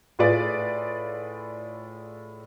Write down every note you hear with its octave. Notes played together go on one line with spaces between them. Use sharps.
A2 F4 G#4 B4 D5 A6